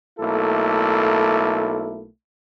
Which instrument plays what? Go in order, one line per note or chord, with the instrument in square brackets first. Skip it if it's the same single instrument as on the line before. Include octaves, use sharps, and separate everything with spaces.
[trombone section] B1 A3 A#3 E4 A4